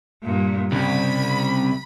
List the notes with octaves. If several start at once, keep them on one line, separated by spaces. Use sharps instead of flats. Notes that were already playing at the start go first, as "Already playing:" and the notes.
G2 A#2
C2 C#3 B5